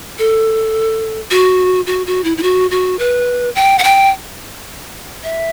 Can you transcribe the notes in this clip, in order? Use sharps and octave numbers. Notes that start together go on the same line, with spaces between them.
A4
F#4
F#4
F#4
E4
E4
F#4
F#4
B4
G5
F#5
G5
E5